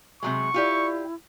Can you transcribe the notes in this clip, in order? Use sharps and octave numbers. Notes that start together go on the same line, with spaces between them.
C3 F#3 G#3 C#6
E4 F4 G4 D5